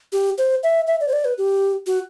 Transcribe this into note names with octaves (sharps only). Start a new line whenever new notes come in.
G4
C5
E5
E5
D5
C5
D5
B4
G4
F#4